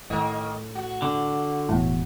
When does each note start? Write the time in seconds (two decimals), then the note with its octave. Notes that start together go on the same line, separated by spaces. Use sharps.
0.10 A2 D#3 A#3 D#5
0.75 F#4
1.02 D3
1.69 E1 E2 A2